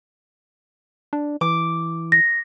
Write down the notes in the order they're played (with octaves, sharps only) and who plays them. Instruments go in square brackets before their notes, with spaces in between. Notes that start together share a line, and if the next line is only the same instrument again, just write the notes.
[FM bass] D4
[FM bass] E3 [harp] D6
[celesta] A#6